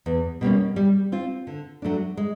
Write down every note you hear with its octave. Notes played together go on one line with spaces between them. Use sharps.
E2
B2 G3 A#3 C#4
G3
C4 F4
D3
F#3 A3 D4
G#3